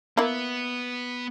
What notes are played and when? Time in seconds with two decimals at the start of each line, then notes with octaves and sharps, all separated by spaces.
0.17 A#3 B3 E4